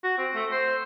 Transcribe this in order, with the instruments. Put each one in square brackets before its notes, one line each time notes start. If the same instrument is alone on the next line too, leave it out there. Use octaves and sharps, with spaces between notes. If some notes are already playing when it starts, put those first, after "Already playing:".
[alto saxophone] F#4
C4
A3
C5